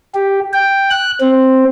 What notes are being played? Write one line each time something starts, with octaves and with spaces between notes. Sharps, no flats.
G4
G5
F#6
C4